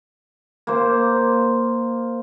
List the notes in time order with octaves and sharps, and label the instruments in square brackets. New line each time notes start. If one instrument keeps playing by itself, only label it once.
[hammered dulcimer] A#3 C5